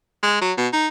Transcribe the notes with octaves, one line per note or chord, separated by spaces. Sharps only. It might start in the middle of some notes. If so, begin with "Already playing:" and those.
G#3
F#3
B2
D#4